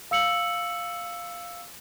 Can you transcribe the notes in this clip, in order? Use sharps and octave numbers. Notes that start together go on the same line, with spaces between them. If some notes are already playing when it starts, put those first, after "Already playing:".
F5 E6 C#7 F#7